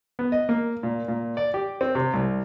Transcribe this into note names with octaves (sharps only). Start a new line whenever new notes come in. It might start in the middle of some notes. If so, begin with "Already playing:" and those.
B3
D#5
A#3
A#2
A#2
D5
G4
C4
C3
C2